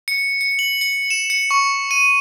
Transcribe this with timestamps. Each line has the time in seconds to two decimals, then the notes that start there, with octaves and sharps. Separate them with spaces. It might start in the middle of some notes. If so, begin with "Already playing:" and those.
0.08 C#7
0.41 C#7
0.59 F#7
0.81 C#7
1.10 E7
1.30 C#7
1.51 C#6
1.91 D#7